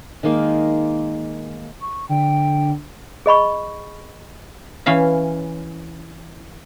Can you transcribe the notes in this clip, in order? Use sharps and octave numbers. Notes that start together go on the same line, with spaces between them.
D#3 G#3 A#3 D#4
C#6
D3 G5
G#4 D#5 B5 C#6
E3 C#4 F5 B5